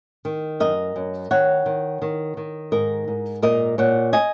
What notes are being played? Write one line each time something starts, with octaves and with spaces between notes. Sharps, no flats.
D#3
F#2 A#4 D#5
F#2
D#3 C#5 F#5
D#3
D#3
D#3
G#2 A#4 D#5
G#2
A#2 A#4 D#5
A#2 C#5 F#5
D#5 G#5